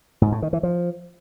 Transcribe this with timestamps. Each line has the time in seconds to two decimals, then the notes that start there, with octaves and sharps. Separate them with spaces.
0.22 G#2
0.32 A2
0.42 D#3
0.53 E3
0.63 F3